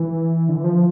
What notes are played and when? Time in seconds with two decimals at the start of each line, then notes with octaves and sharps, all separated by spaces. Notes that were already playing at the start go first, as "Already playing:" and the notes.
Already playing: E3
0.49 D3
0.57 E3
0.64 F3